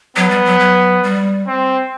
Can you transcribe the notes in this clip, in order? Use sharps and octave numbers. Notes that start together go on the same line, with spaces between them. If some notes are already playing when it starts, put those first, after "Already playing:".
F#3 B3
G3
F#3
F#3
G3
C4